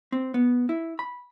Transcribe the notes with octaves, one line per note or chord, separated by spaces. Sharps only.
C4
B3
E4
B5